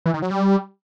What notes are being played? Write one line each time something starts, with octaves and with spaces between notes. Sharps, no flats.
E3
D#3
F#3
G3